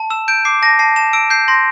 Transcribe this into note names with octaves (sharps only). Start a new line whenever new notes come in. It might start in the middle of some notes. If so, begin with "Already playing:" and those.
Already playing: A5
E6 E7
G6 D7
D6 C7
A5 A#6
A5 C7
A5 E7
E6 D7
G6 C7
C6 A#6